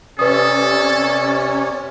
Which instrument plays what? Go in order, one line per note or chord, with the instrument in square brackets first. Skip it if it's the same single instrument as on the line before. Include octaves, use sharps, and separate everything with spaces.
[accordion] C3 C#4 [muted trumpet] A4 [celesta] B4 D#6 [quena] D5